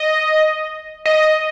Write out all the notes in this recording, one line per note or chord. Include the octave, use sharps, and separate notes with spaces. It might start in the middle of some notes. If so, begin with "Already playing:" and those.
Already playing: D#5
D#5